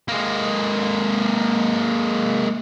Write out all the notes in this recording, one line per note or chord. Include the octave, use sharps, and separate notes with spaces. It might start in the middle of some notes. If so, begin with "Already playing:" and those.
G#3 A#3